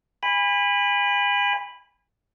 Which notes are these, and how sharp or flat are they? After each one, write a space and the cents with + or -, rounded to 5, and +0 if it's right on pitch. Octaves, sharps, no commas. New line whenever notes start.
G#5 -35 B5 +0